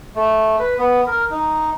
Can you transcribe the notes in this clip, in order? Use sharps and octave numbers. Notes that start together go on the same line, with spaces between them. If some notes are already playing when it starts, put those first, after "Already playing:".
A3
B4
B3
A#4
D#4